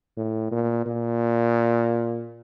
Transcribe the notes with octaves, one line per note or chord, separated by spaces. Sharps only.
A2
A#2
A#2